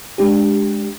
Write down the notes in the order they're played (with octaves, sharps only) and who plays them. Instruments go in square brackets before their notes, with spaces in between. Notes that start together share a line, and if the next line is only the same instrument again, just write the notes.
[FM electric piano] G#3 D4 G4